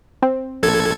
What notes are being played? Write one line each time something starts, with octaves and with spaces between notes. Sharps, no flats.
C4
A#1 A4 G#6